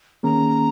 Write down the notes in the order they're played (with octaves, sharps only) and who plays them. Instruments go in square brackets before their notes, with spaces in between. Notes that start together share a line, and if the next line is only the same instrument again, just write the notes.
[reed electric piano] D#3 A#3 C#4 G#4 [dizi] A#5